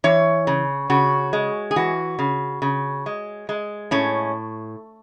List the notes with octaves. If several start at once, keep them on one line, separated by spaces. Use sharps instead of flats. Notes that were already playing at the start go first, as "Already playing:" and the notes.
E3 C#5
C#3
C#3 F#4
G#3
G#4
E3 F#4
C#3
C#3
G#3
G#3
A2 C#4